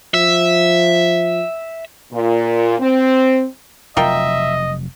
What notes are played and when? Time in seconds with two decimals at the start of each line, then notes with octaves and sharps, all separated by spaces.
0.14 F3 E5
2.13 A#2
2.80 C4
3.97 F1 F#3 F4 A#4 D#5 E5 G5